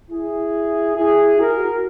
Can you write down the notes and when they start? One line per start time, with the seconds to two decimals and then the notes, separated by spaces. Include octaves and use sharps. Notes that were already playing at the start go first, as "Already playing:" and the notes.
0.11 E4 G#4
0.96 E4 G#4
1.38 F#4 A#4